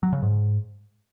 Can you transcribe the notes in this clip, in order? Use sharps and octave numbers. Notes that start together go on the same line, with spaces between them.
F#3
C#3
G#2